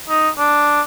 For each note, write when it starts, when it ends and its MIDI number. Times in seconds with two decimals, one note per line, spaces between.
0.09 0.30 63
0.39 0.81 62